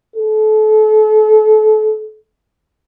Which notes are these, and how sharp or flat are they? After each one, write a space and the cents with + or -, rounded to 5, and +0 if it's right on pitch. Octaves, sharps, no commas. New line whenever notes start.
A4 -30